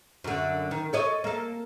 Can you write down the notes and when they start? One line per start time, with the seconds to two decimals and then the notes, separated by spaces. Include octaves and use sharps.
0.24 F#2 D3
0.71 D#3
0.93 A4 C#5 D#5
1.24 A#3 A4